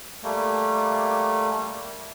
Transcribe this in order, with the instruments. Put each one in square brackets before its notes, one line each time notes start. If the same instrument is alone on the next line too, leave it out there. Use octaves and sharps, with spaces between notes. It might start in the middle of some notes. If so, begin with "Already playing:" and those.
[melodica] G3 A3 A#3